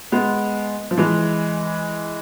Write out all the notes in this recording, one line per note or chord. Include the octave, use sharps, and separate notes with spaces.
G#3 B3
F3
E3 G#3